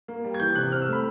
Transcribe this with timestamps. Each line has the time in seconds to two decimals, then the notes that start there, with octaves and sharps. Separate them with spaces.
0.08 A#3
0.24 G3
0.34 G#6
0.40 E3 G6
0.55 C3 F#6
0.72 C4 F6
0.82 E6
0.88 A3 B5